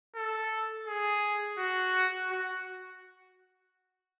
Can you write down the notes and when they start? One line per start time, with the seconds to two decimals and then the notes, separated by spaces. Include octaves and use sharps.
0.15 A4
0.87 G#4
1.58 F#4
2.31 F#4